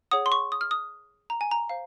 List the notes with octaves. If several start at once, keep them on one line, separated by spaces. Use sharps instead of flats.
G#4 C#5 F#5 D#6
C6
C#6
D#6
F6
D#6
A#5
G#5
A#5
C5 F5